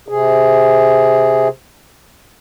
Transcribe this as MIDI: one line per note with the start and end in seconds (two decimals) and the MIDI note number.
0.08 1.48 48
0.08 1.48 68